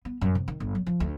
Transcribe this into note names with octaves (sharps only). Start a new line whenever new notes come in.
B3
F#2
C3
D#3
G1
F#3
F3
D2